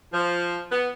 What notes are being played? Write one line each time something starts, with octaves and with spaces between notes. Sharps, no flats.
F3
B3